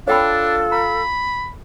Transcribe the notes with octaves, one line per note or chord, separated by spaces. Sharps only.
D4 F4 A4 C#5 G5 B5
A#5 B5